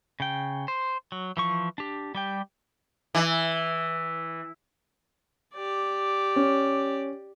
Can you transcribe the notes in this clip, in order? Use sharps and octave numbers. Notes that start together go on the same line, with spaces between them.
C#3 G5
C5
F#3
E3 F3 C#6
D4 G4
G3 G4 G5
E3
G4 D5
C#4